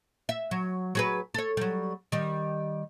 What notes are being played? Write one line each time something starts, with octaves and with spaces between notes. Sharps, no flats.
E5
F#3
F#3 G#4 B4
A4 C#5
F#3 G3
D#3 G3